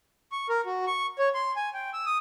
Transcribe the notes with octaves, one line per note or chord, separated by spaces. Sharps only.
C#6
A#4
F#4
C#6
C#5
C6
G#5
G5
E6
D#6